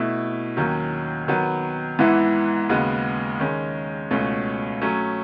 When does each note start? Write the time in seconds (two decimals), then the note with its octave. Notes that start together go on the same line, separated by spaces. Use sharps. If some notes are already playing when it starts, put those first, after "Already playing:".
Already playing: B2 A3 E4
0.57 D#2 D#3 F#3 C#4
1.28 D#3 F#3 B3
1.99 G#2 E3 B3 E4
2.69 D#2 C#3 G#3 B3 F#4
3.40 D#3 G#3 C#4
4.11 C#2 B2 A3 C#4
4.82 F#3 A3 C#4